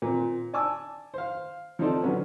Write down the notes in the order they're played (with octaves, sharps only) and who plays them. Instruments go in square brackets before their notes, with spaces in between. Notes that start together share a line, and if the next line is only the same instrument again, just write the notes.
[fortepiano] A#2 C4
D5 G#5 A5 D6 E6
C5 F5
F3 C4 D#4 A4 C5 D5
D3 F#3 B3 C#4